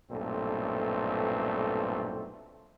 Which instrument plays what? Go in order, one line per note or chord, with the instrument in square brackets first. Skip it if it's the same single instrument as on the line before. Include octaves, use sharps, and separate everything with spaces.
[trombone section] B1 G2 A#2 A3 C4 A4